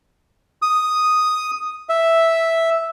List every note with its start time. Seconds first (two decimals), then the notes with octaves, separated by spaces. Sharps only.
0.62 D#6
1.89 E5